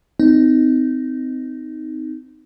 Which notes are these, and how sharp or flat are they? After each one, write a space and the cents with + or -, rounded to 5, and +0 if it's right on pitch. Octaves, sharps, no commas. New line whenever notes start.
C4 -25 D#4 +0